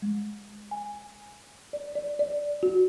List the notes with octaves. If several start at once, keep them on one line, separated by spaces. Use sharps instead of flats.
G#3
G#5
D5
D5
D5
F#4